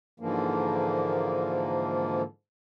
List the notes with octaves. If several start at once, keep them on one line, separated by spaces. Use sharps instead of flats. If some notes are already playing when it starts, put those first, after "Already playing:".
G#2 D3 E3 F3 A#3